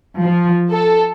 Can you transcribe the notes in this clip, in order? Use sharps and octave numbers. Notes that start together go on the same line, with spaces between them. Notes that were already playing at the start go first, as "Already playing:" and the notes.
F3
A4